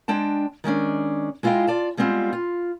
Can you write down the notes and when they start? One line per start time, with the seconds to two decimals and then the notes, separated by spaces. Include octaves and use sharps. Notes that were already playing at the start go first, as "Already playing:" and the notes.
0.08 G#3 D4 G5 A5
0.64 D#3 G#3 C#4 D4
1.43 G#3 E4 F4 C5 D#5 G5
1.67 F4 D5 A5
1.97 G3 G#3 B3 C4 F4
2.33 F4